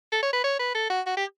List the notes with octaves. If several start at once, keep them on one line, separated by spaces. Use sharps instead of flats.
A4
C#5
B4
C#5
B4
A4
F#4
F#4
G4